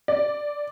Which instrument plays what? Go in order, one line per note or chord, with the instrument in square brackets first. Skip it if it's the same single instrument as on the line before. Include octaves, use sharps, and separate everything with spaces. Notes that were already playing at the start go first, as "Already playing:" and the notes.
[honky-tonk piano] D5